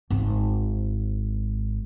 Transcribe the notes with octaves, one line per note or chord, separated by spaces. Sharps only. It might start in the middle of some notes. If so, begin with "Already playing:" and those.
G#1 G#2